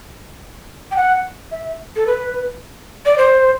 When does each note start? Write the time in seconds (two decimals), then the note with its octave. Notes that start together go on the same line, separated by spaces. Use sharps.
0.91 G5
0.96 F#5
1.51 E5
1.96 A4
2.07 B4
3.06 D5
3.18 C5